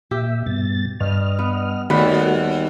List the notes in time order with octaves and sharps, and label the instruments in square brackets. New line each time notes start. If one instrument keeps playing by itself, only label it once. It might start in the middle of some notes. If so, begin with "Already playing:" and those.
[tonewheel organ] A#2 E5 [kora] G4
[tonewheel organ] G2 B2 A6
[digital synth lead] G2 [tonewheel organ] D#5 F6
[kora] B3
[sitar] D#2 [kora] G3 B3 B4 [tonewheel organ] A3 F#4 [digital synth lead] F#5